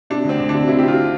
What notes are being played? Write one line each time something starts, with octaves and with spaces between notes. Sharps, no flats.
C3 D4
D2 C4
D2
C3 D4
C3 E4
G4
C3 F4